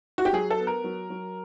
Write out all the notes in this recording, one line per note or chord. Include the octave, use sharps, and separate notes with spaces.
F#4
G4
F#3 G#4
A4
B3
A#4
F#3
F#3